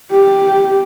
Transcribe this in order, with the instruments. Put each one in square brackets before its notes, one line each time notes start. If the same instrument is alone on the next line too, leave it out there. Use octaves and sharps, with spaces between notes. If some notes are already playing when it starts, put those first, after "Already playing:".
[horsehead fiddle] G4